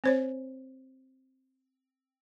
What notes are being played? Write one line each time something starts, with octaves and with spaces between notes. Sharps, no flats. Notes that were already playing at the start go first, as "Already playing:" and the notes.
C4 C5 C#5